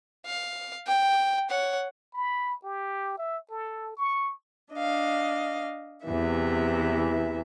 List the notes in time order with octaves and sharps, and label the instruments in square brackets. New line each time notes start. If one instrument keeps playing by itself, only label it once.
[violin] F5
G5
C#5 F#5
[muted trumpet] B5
G4
E5
A4
C#6
[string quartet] D4 D#5 F5
E2 C3 E3 E5